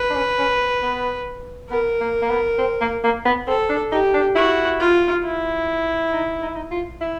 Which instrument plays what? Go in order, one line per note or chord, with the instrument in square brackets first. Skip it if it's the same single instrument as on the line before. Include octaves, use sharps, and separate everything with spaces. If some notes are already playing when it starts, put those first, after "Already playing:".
Already playing: [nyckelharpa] B4
[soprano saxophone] D4
C#4
C#4
C4
B3
[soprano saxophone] B3 [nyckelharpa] A#4
[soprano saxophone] A#3
A#3
B3
C4
A#3
A#3
B3
[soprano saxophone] C4 [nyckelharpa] A4
[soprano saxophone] D4
[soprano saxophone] D#4 [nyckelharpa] G4
[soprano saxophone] D4
[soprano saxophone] E4 [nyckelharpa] F#4
[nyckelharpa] F4
E4
[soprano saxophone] D#4
D#4
E4
D#4
F4
E4